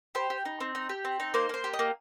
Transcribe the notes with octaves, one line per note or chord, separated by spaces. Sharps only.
G4 C5
G4
D#4
C4
D#4
G4
C4
D#4
A#3 C5
A#3 C5
G4
D#5
A#3